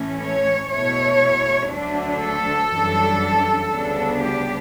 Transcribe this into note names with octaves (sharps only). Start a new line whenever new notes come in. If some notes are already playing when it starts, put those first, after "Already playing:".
Already playing: A2 E3 A3 C#4
C#5
B2 A3 E4 C#5
D2 D3 F#3 A3 D4
A4
F#2 E3 G3 D4
D2 C#3 G3 B3 D4
G4